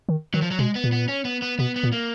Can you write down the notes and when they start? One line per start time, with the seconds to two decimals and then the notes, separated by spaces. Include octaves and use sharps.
0.09 D#3
0.34 D#3 F#3
0.42 F3
0.51 F#3
0.59 B2 G#3
0.75 B3
0.84 A#2
0.92 B3
1.08 C#4
1.25 B3
1.42 B3
1.59 B2 B3
1.76 B3
1.84 A#2
1.92 A#3